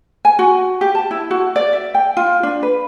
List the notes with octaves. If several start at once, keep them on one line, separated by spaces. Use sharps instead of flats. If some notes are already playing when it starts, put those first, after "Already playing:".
G#5
F#4
G4
A5
E4
F#4
D5
E5
G5
F4
D4
B4